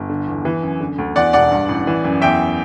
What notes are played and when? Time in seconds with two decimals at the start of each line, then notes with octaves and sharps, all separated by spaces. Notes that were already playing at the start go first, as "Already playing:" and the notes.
Already playing: G1
0.09 D3
0.27 E2
0.45 E3
0.63 F#2
0.80 D3
0.98 D2
1.15 E2 D5 F#5
1.33 E1 D5 F#5
1.51 G2
1.69 A1
1.87 E3
2.04 F#2
2.21 E2 E5 G5